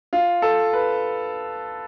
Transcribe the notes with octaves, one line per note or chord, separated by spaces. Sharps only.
F4
A4
B4